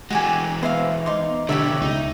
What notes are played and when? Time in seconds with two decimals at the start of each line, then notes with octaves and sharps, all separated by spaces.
0.10 E3 G#3 F#4 G4 G#5
0.63 B3 C5 E5 F5
1.06 D#4 C6 D6
1.49 B2 D3 G3 G4 C#5 E5
1.82 C#2 D#4